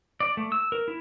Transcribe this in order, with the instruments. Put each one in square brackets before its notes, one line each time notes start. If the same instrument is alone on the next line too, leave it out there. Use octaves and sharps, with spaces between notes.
[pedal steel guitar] D5
A3
E6
A#4
E4